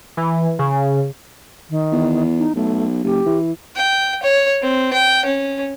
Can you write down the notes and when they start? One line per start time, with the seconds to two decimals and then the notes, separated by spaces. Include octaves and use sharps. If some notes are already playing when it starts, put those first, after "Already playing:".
0.17 E3
0.59 C#3
1.70 D#3
1.92 E2
2.38 D#4
2.56 B1 A3
3.04 F#1 G4
3.26 E3
3.76 G5
4.23 C#5
4.62 C4
4.93 G5
5.25 C#4